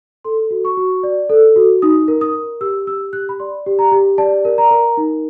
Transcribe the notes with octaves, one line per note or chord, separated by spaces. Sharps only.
A4 C6
F#4
C#6
F#4
D5
A4
F#4
D#4 D#6
A#4
D#6
A#4
G4 E6
G4 E6
G4 F#6
B5
D5 C6
G4
A#5
G4
D5 A5
A#4
A#5
A#4
D#4